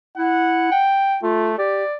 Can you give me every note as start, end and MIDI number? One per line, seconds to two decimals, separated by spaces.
0.18 0.69 64
0.18 0.88 78
0.71 1.18 79
1.23 1.58 57
1.23 1.53 65
1.58 1.84 67
1.58 1.96 74